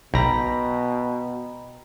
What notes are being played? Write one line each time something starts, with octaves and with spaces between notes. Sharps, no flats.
B1 B2 G5 A#5 B5 A#6